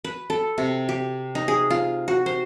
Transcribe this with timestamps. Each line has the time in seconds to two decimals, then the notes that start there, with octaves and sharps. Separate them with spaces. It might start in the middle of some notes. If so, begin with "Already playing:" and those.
0.05 B4
0.30 A4
0.58 C3
0.89 G4
1.35 D#4
1.48 G#4
1.70 F4
2.08 F#4
2.26 C5